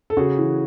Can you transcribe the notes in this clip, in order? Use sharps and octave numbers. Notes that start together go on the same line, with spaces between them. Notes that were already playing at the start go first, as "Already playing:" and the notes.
A4
C#3 F#4 G#4
E3